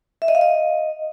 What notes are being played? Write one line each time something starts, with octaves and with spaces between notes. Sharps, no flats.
E5
D#5
F5
D#5